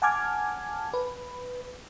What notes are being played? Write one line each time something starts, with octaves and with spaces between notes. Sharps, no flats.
F#5 G#5 A5 D6 F6 G#6
B4